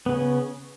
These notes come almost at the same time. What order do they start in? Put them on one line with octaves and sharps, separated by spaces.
B3 C#3 C#4